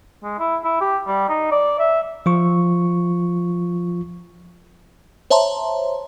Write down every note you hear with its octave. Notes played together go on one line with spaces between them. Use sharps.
G#3
E4
E4
G4
G3
D#4
D5
E5
F3 F4 C#6
C5 C#5 E5 A5 A#5 C6